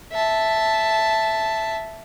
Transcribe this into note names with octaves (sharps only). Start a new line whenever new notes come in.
E5 A5